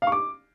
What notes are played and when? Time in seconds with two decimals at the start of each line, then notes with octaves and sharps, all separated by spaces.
0.02 F5
0.07 C#6
0.12 D6